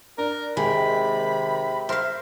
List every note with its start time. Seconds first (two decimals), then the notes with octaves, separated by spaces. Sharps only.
0.18 D4 A#4
0.57 D#2 C3 G#3 G5 B5
1.89 A#4 C5 E5 F5 C6